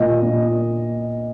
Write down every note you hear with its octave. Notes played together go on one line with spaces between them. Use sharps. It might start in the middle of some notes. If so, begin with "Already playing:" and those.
Already playing: A#2 D#5
A#2